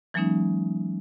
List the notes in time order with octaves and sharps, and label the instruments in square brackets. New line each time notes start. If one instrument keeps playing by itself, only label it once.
[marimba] E3 F#3 G#3 A#3 C#4 D#4